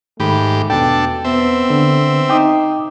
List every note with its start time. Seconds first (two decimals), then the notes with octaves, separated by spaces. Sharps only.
0.20 G#2 D#3 A3 G4 B5
0.70 E2 B2 D4 A4 G5
1.24 B3 C4 E5
1.70 D3
2.30 D#4 G5 D6 D#6